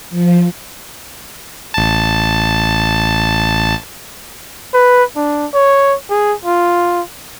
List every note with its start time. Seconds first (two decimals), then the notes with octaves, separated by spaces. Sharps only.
0.10 F3
1.74 A1 A5
4.74 B4
5.16 D4
5.54 C#5
6.10 G#4
6.45 F4